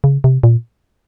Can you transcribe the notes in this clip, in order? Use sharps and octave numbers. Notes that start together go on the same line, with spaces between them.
C#3
C3
A#2